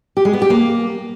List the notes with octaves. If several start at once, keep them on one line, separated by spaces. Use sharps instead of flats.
G4
G#3
B3
G4
A#3